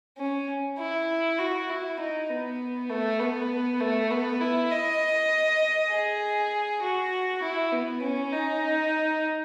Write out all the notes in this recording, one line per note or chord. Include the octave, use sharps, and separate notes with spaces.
C#4
E4
F#4
E4
D#4
B3
A3
B3
A3
B3
E4
D#5
G#4
F#4
E4
B3
C#4
D#4